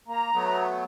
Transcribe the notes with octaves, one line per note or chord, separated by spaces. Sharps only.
A#3 A#5
F#3 A3 B3